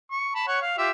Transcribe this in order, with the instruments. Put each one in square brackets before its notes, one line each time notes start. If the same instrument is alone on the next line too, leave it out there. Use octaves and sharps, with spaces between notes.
[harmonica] C#6
A5 B5
C#5 F#5 C#6
F5
F4 G4 E5